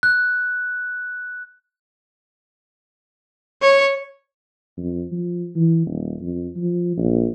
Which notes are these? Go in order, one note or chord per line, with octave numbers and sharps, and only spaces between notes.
F#6
C#5
F2
F3
E3
D#1
F2
F3
A#1